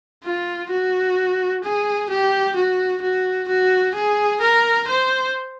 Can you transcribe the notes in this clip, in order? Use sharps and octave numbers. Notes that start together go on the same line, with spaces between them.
F4
F#4
G#4
G4
F#4
F#4
F#4
G#4
A#4
C5